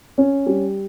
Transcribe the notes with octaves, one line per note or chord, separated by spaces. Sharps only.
C#4
G3